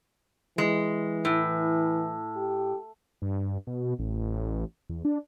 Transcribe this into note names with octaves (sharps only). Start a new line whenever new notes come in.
E3 G#3
A2
G4
G2
B2
A1
E2
D4